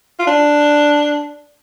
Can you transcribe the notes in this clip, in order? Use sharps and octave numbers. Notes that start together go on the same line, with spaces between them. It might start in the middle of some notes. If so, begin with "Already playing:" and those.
F4
D4